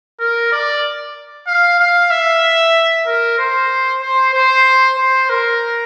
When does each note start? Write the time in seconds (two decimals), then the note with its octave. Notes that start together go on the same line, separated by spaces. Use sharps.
0.20 A#4
0.52 D5
1.47 F5
1.79 F5
2.11 E5
3.07 A#4
3.39 C5
4.02 C5
4.33 C5
4.98 C5
5.30 A#4